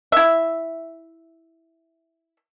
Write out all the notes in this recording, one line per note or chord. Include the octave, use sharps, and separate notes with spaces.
E4 E5